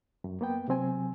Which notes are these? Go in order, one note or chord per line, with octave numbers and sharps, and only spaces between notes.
F#2
A#3 B3 G5
C3 F#3 C4 G#5